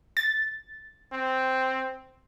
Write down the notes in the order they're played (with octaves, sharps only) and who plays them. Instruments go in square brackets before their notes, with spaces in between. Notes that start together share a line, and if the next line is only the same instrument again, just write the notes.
[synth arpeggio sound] A6
[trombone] C4